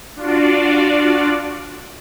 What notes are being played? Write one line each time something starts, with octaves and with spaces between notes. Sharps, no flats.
D4 F4 F#4 D5